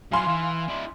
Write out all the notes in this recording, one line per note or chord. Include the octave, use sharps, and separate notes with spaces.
F#3 E4 F5 G#5 C6
E3
D4 E4